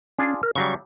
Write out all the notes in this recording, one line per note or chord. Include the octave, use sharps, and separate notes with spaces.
C#4 D4 F4 G#4
A#4
C#3 F#3 G3 C#6